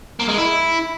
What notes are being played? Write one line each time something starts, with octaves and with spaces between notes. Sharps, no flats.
A#3
G#3
E4